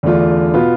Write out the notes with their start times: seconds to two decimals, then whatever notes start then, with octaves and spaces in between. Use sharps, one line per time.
0.03 E2 D3 A3 D4 F4
0.54 B2 B3 F4